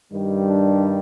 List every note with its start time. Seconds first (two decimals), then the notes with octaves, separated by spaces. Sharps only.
0.13 G2 D#3 G3
0.48 D4